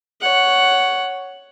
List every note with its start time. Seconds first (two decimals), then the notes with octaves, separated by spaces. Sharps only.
0.21 C#5 F#5